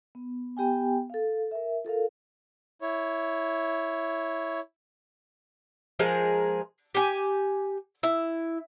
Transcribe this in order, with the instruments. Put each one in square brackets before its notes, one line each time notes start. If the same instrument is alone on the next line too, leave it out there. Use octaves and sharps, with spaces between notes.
[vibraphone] B3
B3 G4 G5 G#5
A4 F5
A#4 E5
F4 A4 A#4 F5
[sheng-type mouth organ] E4 C#5
[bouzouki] F3 G#3 G#4 A#4
G4 G#5
E4